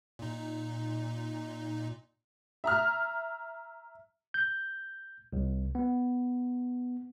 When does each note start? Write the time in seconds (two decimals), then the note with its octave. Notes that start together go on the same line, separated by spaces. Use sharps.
0.19 A#2 D#4
2.64 E5 A#5 F6
4.34 G6
5.33 C2
5.75 B3